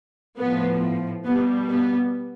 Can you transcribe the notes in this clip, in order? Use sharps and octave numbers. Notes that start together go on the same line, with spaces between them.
A2 F3 B3
B2 G3 B3
B3